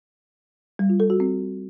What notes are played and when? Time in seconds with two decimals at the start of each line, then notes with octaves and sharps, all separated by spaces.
0.79 G3
0.89 F4
1.00 A4
1.10 F#4
1.20 C4